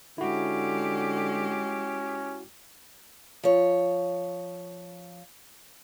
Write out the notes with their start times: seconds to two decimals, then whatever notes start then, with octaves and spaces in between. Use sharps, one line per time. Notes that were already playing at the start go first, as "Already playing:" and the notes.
0.18 D3 G#3 C#4 E4 F#4 G4
3.44 F3 C#5